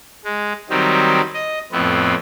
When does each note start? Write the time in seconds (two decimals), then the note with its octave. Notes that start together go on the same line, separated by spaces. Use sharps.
0.24 G#3
0.70 D#3 F#3 G3 C4 D#4
1.34 D#5
1.72 F2 A2 B3 C4